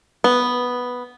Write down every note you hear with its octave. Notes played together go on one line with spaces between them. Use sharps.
B3